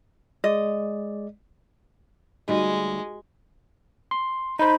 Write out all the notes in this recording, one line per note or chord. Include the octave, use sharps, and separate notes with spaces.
G#3 D5 D#5
D2 G3 G#3 D#4 F#4 G4 D#5
C6
D#4 C5 B5